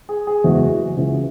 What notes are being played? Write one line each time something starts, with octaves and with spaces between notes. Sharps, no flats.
G#4
G#4
F#1 E2 E3 G#3 F#4
C#2 C#3 E3 G#4